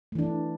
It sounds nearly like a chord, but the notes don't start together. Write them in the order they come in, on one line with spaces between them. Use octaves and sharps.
A3 E3 D4